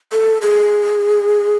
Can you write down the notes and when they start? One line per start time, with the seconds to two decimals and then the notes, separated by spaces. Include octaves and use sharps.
0.12 A4
0.42 G#4